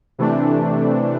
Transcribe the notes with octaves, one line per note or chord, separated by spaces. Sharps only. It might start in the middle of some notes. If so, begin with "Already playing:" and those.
C3 E3 A3 D4